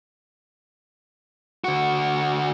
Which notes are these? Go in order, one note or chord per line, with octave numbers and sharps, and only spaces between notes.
D3 F#4